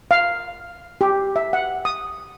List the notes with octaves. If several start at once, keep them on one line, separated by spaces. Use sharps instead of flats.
F5
G4
E5
F#5
D#6